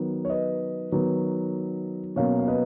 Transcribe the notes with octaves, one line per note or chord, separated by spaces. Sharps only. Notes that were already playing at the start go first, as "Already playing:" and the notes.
Already playing: D#3 F#3 B3
C#5
B4 D#5
D#3 F#3 B3
B2 F#3 A#3 C#4 C#5 F5
F5
B4 D#5